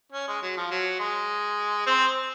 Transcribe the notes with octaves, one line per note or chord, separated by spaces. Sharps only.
C#4
G#3
F#3
F3
F#3
G#3
C4